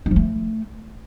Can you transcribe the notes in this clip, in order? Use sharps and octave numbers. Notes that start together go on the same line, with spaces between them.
D#4
F3
A3